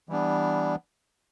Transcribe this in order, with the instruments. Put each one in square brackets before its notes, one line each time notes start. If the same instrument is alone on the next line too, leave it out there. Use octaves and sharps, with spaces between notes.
[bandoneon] E3 G3 B3 D4